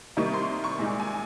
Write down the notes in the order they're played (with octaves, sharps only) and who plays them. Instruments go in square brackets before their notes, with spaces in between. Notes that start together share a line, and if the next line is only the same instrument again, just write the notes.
[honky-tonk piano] C3 D#3 G3 A#3 D#4 C#6
C6
C#6
A#2 G#3 D#4
G#5